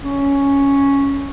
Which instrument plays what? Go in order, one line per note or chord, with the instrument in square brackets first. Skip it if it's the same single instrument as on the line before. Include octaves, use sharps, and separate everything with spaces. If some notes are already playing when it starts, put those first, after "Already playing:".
[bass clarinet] C#4